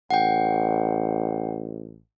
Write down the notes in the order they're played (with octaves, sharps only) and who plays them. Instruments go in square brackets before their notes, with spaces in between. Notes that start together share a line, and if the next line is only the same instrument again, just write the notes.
[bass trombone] A1 [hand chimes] F#5 G5